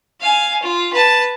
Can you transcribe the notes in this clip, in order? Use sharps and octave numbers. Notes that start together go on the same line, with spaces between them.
F5 G#5
F4
B4 A5